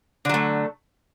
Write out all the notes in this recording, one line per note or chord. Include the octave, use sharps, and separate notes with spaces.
D3 F#3 A3